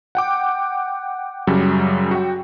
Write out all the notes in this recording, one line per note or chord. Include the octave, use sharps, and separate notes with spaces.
F#5 G5 D6
F#2 C#3 F#3 G3
F#4 G5